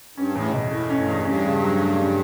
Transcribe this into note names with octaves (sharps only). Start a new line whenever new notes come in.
G2 C#4
E2 A2
B2
A2 A3
C#4
G2
E2
G2 C#4
C#3
F#3
A3
C#4